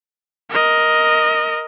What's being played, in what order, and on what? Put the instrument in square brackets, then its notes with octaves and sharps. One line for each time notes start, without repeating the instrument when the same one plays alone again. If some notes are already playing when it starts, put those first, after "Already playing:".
[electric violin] A#4 D#5